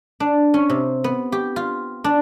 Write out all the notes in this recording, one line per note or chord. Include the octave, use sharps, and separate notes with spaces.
D4
C#4
C3
B3
G4
F4
D4